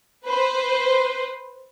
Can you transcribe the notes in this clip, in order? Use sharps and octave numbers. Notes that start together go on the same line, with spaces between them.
B4 C5